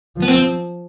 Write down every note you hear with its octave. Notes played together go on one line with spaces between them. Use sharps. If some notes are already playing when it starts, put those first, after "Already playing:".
F3
B3
C4